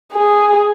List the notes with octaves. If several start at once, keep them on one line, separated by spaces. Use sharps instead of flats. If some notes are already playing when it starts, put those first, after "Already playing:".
G#4